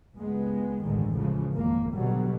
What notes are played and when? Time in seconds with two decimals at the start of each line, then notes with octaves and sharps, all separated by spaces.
0.15 C#2 G2 G#3 B3
0.83 A1 D2 G2 D3 D#3 G#3
1.14 C#3 E3 F3 G#3
1.53 G#1 F2 C#3 A#3
1.93 B2 D3 F#3 G3